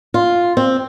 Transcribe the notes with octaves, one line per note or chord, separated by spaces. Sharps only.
F4
C4